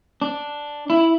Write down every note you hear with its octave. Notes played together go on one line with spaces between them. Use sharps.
D4
E4